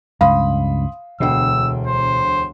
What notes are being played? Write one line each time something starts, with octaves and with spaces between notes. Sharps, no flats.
C#2 G2 F5 B5 C6 D#6
E1 D2 B2 G5 E6
C5